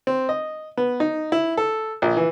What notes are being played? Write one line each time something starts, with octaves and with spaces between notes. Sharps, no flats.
C4
D#5
B3
D#4
E4
A4
A#1
E3